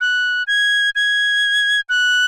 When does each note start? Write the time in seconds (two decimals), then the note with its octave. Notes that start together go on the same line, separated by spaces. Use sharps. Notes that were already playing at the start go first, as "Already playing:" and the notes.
0.01 F#6
0.47 G#6
0.95 G#6
1.89 F#6